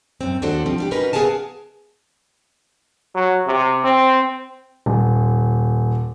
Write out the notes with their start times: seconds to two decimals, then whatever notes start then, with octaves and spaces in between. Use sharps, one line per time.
0.21 F#2 C4
0.42 D#2 D4 F#4 A4 C5
0.66 F3 G3 C4
0.78 G3 D4 G4
0.91 C#4 D#4 F#4 A#4 B4
1.13 B3 G#4 A#4 F5 G#5 A5
3.15 F#3
3.47 C3
3.84 C4
4.86 D#1